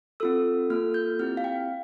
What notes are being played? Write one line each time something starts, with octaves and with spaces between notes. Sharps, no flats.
C4 F4 A4 E6
A#3 F4 A4 F6
G6
C4 E4 G4 F6
F5
G5